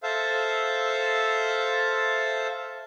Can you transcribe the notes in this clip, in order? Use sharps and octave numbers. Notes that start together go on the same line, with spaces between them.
A4 C5 E5 F5